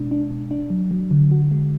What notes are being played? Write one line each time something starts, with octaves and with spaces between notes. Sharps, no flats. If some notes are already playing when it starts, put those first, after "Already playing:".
Already playing: B2 G#3 D4
D4
B2
D4
F#3
F#3
D3
F#4
G#3